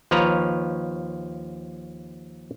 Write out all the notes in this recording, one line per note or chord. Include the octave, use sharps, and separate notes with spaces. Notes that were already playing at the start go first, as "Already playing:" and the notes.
D#2 F3 B4 C#5 A#5